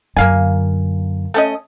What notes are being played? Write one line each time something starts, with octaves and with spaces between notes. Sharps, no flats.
F#2 D3 A#3 F5 G#5
A3 C#4 D#5